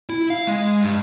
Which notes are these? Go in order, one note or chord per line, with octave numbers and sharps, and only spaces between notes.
E4
F5
G#3
G2